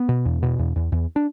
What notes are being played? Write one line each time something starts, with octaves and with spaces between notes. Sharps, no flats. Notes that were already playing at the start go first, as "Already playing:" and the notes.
Already playing: B3
B2
E2
B2
E2
E2
E2
D4